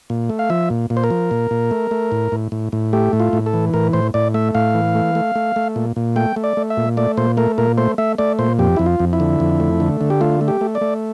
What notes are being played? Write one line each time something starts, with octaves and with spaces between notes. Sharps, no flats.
A#2
A3
F5
F3 E5
A#2
A#2
C5
A#4
F3
A#2
A#2
A3
A3
A2
A2
A2
A2
A3 G4
A2
F4
A2
A4
E3
A2 A#4
A2 C5
A2 D5
A3 E5
A2 F5
E3
A3
A3
A3
A3
A#2
A#2
A3 G5
A3
D5
A3
E5
A#2
A3 D5
A#2 C5
A3 A#4
A#2 A#4
A3 C5
A3 E5
A3 D5
A#2 C5
F2 G4
F2 E4
F4
F2
E4
D3
F2
A3
D3
D3
G4
A3 F4
A3
G4
A3
D5
A3